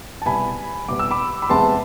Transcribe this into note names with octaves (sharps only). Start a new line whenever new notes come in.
A5
C2 B2 B3 G#5 B5
C2 B2 B3 D6
E6
B5 D6
B5
E2 C3 G#3 B3 A5 C6